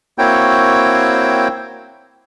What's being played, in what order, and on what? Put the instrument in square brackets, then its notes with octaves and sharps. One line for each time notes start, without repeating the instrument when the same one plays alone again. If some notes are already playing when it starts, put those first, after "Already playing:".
[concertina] A#3 C4 E4 F#4 C#5 G5